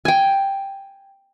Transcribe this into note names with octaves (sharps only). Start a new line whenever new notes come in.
G5 G#5